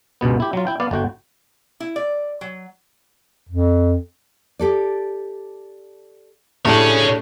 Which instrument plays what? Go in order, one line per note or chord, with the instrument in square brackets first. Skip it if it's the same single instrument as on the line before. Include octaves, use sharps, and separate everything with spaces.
[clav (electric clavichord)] C#2 G2 B2 B3
E4 G4
F#3 F4
E4 G5
B3 D5 F5
G1 D3 F#4 G5
[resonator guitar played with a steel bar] E4
D5
F#3
[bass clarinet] F2
[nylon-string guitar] G4 A4 D5
[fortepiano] A2 [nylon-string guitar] D4 G4 [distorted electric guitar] G#4 C#5